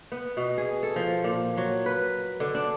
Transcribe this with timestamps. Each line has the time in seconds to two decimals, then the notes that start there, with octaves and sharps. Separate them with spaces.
0.12 B3
0.37 B2
0.58 G#4
0.83 A4
0.96 F3
1.24 A#2
1.57 F#3
1.86 B4
2.40 D3
2.55 D4